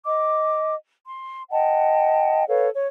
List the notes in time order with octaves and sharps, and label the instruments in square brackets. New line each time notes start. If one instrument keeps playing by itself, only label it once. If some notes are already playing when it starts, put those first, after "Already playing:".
[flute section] D#5 D6
C6
D#5 F#5 G5 A5
A4 B4 C#5 F5
C#5